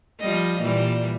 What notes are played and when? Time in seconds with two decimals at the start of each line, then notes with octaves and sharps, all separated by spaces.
0.20 F3 G3 D#5
0.60 A#2 E3 G3